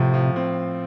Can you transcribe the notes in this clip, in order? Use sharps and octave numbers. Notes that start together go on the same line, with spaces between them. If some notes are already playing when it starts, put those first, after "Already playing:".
Already playing: A2 C3 F3
F3
C4